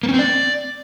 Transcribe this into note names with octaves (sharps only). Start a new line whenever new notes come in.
A#3
C#4
C4
D5